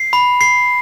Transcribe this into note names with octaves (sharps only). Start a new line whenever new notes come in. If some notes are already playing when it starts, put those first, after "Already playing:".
Already playing: C7
B5
C7